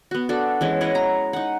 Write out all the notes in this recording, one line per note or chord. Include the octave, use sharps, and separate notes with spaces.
B3 F#4
D4 F#4 A4
E3 G#3 C#4
E4 C#5 D#5 F#5
A#5
D#4 F#5